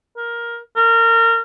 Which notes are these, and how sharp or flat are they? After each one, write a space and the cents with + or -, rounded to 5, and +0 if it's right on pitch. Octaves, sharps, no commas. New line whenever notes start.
A#4 +10
A#4 -25